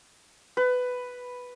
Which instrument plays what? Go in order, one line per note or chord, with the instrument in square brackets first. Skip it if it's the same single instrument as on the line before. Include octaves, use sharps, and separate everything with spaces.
[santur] B4